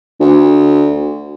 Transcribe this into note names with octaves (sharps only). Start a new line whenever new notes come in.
D2